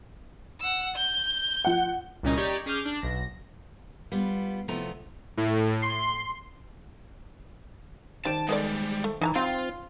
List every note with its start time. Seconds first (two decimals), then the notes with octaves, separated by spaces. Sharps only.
0.60 F#5 E6
0.96 G6
1.65 F3 F#5
2.23 C2 A#2 C#3 C#4 D#4
2.37 D#4 G4 C#5 D5
2.66 C#4 G#4 D6 F6 G6
2.85 D4
3.02 B1 A#6
4.12 G3 B3 F4
4.68 E2 C3 F3 A3 B3 A#5
5.37 A2
5.82 C6
8.25 D#3 G3 C5 A5 D7
8.49 G3 G#3 B3 A4 D5
9.04 A3
9.21 E3 D#4 A5 A#5
9.35 C4 F4 F5 C6